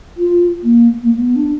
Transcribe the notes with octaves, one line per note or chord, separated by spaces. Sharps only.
F4
A#3
A#3
A#3
B3
D4